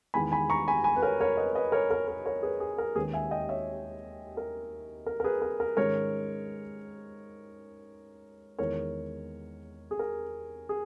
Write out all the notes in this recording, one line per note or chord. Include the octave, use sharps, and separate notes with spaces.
E2 D#3 G#3 G#5 B5
G#5 B5
A#5 C#6
G#5 B5
G#5 B5
B4
A#4 C#5
A#4 C#5
B4 D#5
B4 D#5
A#4 C#5
A#4
A#4
A#4 C#5
G#4 B4
G#4
A#4
D#2 D#3 G#3 C#4 G#4 B4
E5 G#5
D#5 G5
C#5 E5
A#4
A#4
A#4
G#4 B4
A#4
A#4
G#2 D#3 G#3 C#4 A#4 C#5
E2 D#3 G#3 A#4 C#5
G#4
A#4
G#4